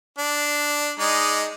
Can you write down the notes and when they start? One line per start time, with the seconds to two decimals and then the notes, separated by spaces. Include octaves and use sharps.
0.18 D4
0.99 G#3 D#4 D5